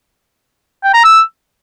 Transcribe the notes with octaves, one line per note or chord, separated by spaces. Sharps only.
G5
A#5
E6